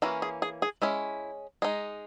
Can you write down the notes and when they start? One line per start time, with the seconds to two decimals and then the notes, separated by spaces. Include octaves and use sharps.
0.02 E3 A#3 C#4 F#4
0.22 G#4
0.42 G#4
0.62 G#4
0.82 G#3 C#4 E4
1.62 G#3 D#4